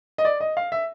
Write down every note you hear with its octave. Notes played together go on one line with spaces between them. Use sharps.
D#5
D5
D#5
F5
E5